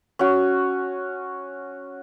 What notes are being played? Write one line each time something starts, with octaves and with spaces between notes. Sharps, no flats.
C#4 F#4